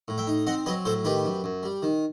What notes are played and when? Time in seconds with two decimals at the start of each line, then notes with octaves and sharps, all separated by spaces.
0.08 A2
0.18 E5 G5
0.27 D#4
0.47 C4 D#5 F#5
0.66 F#3 B4 D#5
0.85 A2 A4 C5
1.05 D#3 G4 B4
1.24 F#2
1.44 F#2
1.63 G3
1.82 D#3